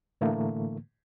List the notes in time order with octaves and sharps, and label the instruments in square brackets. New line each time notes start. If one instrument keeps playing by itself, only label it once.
[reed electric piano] A2 D3 E3 A3 A#3